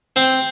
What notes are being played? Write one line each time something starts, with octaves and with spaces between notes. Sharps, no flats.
C4